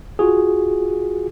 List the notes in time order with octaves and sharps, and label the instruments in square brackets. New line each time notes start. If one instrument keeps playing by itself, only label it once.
[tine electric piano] F4 F#4 G#4